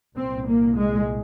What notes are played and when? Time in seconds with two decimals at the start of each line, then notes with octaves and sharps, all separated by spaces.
0.16 C2 A#2 C4
0.47 A#3
0.77 G#3